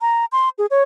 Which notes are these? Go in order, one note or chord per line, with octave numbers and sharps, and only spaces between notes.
A#5
C6
G#4
C#5